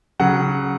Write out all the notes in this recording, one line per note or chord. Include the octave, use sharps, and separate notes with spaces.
C#3 F#3 F#5